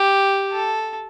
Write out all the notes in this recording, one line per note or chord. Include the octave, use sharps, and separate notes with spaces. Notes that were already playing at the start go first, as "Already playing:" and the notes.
Already playing: G4
A4